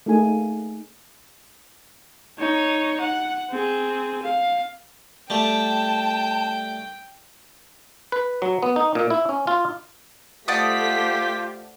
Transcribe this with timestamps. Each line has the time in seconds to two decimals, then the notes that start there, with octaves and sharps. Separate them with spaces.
0.06 A3 A#3 D#4 G#4 G#5
2.39 D#4 C#5
3.00 F#5
3.51 C4 G#4
4.23 F5
5.30 G3 A3 G5 A5
8.12 B4
8.42 F#3
8.63 B3
8.76 D#4
8.95 A#2
9.10 E4
9.29 C#4
9.47 F4
10.48 A3 F4 G4 C5 D5 F#5 D#6 B6